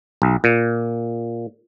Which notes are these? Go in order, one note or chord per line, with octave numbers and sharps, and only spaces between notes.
B1
A#2